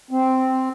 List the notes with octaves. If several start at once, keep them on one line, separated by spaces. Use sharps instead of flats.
C4